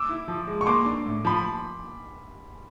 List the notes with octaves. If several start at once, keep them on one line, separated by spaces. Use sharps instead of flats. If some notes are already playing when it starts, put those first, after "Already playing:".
Already playing: D6 E6
E4
F3
G#3
C#6
A#3 C6 D6
D4
A2
F3 B5